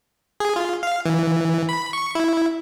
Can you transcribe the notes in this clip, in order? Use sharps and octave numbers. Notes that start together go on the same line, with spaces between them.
G#4
F4
F5
E3
B5
C#6
E4